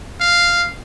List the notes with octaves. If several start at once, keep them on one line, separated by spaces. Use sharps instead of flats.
F5